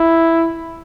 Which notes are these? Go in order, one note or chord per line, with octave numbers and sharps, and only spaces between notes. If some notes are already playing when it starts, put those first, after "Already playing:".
Already playing: E4